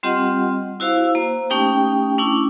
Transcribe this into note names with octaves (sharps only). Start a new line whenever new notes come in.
G3 C4 F4 G4 D#5 F#5
E4 F#4 C5 F5 E6
A#3 C5
A3 C#4 D#4 G4 G5 D#6
A3 C#4 D4 E4